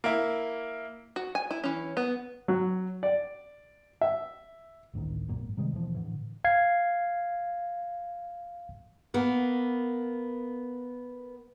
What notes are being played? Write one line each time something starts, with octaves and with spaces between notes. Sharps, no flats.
A#3 E4
F#4
G#5
E4
E3 C#4
B3
F#3
D5
E5
A1 D2 A2 D#3
B1 F#2 A#2
G#1
C3 D#3 G3 G#3
D#2 B2 E3 F3
A2 D3 E3
F5 G#6 C7
A#3 B3 A#4